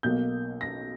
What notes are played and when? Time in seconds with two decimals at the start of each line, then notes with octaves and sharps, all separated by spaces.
0.03 B1 B2 A#3 G6
0.61 A#6